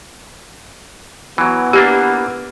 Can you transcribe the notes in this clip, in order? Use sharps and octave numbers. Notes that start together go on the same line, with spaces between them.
E3 F#3 B3
E3 A#3 D4 G4